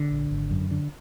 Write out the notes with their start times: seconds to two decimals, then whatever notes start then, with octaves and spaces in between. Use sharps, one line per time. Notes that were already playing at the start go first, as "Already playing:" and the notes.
Already playing: D3
0.11 A#1
0.31 G#1
0.51 F#2
0.71 D3